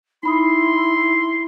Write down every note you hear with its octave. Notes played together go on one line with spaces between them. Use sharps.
D#4 E4 B5 C6 D#6